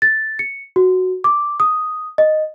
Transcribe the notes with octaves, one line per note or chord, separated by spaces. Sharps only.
A6
C#7
F#4
D6
D#6
D#5